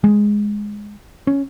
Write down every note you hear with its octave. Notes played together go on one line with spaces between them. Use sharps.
G#3
C#4